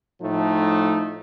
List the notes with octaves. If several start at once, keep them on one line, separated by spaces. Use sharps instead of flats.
A2 F3 A3 D#4